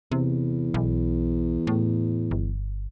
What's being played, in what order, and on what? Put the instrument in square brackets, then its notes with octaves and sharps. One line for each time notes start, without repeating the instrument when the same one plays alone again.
[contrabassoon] E2 [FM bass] C3
[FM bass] B1
A2
G1